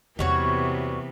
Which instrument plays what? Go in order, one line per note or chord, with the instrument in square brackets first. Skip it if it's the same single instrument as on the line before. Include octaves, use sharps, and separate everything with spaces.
[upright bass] E2 A#3 [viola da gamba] C3 E3 B3 [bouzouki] G3 F#4 C#5